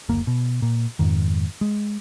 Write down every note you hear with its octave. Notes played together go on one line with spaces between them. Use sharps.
F#1 D2 A#3
B2
A#2
F2 G#2 D#3
G#3